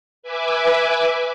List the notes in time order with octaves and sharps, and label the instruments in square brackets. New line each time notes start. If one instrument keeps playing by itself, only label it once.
[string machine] B4 E5 G#5 D6